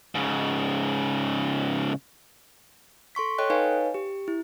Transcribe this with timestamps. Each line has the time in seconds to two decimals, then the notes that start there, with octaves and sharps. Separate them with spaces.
0.15 G#2 C#3
3.15 A4 C6 C#6 B6
3.38 A4 C#5 D#5 G5 F#6
3.50 D#4 B4 C#5 D#5 F5 G#5
3.94 G4
4.28 E4